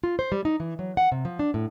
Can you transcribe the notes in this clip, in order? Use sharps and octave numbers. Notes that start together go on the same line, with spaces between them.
F4
C5
G3
D#4
E3
F#3
F#5
C3
F3
D4
A2